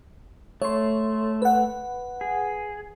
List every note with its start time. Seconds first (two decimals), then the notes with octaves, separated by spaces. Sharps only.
0.62 A3 C#5 C6
1.42 B4 F#5
2.21 G#4